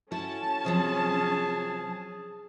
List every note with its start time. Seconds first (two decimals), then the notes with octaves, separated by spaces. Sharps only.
0.12 C#4 E4 F#4 A4 A5
0.65 C3 F3 F#3 G#4